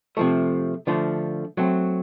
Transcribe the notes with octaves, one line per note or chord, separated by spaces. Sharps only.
C3 F3 A3
D3 F3 A3
F#3 A3 C4